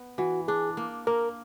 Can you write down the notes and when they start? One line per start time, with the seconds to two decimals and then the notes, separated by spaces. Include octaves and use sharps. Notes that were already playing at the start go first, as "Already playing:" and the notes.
Already playing: B3
0.18 E3 F#4
0.48 D4 G#4
0.77 A#3
1.07 A#3 A#4